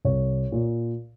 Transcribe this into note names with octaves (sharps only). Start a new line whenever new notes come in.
C2 C#5
A#2